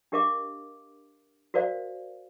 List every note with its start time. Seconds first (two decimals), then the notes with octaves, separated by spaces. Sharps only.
0.12 D4 G4 A#4 D#5 F5 D6
1.54 F#4 A#4 C5 D5 F5